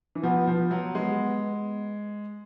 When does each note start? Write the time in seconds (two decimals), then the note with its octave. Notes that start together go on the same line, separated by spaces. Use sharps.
0.15 E3
0.23 F3 B3
0.47 F3
0.71 F#3
0.95 G#3 B3